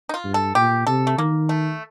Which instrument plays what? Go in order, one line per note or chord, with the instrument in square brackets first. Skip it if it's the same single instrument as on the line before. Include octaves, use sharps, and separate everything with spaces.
[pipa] D#4
F4
[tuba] G2
[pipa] A4
[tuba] A#2 [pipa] G4
[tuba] C3 [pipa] A4
[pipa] A3
[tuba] D#3 [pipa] A#3
[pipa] A3